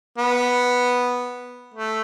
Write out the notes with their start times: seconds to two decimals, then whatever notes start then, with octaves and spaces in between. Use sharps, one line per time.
0.18 B3
1.74 A3